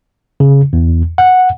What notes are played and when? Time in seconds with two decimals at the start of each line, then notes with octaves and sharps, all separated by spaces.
0.40 C#3
0.73 E2
1.18 F#5